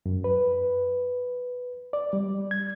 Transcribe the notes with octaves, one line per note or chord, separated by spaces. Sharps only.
F#2
B4
D5
G3
G#6